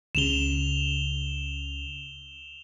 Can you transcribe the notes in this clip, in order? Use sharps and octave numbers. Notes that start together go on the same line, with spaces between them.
C#2 C#3 E7 F7 G7